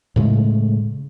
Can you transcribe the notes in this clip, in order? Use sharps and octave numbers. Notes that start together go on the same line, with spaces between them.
A2 C#3 G#3 A3